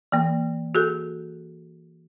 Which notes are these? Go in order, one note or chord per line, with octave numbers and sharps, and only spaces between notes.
E3 A#3
F#4 G#4 A4